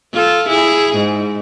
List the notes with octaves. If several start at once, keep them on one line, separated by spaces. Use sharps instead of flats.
F4 A4
E4 G#4
G#2